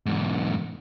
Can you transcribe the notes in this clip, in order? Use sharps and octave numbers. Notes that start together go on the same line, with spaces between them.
E2 G#2